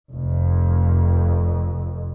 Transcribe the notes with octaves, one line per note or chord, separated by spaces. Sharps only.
F1 F2